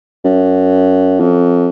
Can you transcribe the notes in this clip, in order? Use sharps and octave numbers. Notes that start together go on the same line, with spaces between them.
F#2
F2